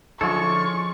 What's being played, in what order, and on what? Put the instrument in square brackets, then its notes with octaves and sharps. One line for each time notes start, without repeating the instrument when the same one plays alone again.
[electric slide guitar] D3 E4 A4 [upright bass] F3 [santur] G#3 C#4 F4 [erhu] C#6